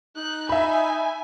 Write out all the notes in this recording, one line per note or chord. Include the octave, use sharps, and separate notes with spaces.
D#4 F#6
E5 G#5 B5